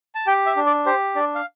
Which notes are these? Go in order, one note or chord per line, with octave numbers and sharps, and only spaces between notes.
A5
G4 G5
E5
D4
D5
G4 C5
D4 D5
F5